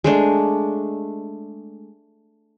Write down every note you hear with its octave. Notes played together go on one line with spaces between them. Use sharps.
G#3 A3 D4